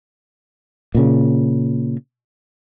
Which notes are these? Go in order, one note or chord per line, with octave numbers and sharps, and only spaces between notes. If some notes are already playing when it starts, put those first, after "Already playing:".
A#2 C#3